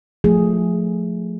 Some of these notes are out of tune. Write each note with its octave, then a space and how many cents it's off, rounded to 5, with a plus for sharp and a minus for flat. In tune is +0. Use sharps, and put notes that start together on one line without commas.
F3 +25 A3 +0 G#4 +0